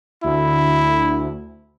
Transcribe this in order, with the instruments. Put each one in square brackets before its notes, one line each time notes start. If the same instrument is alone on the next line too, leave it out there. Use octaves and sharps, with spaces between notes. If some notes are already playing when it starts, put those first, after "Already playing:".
[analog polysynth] D2 [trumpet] E4